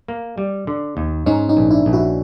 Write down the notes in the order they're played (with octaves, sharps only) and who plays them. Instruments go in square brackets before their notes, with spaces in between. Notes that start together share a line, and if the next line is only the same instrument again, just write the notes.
[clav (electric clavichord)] A#3
G3
D3
D#2
[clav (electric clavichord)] G#2 [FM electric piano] C#4 D#4
[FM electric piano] C#4 D#4
[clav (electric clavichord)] A#1
[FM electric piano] D4 E4
[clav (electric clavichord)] A#1
[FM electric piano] E4 F#4